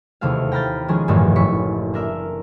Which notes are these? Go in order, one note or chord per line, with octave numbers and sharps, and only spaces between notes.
E1 D#2 C3 A3 E4 F5
G5 A#5 B5 F6 G6 A6
D#3 F3 G#3 C#4 G#4
A1 E2 G2 A#2 D#3 A3
F#1 A2 C#6 B6
D4 A#4 E5